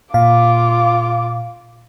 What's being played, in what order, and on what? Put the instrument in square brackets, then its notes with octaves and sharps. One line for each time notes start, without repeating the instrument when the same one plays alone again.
[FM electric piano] A#2 F5 [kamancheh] F4 D6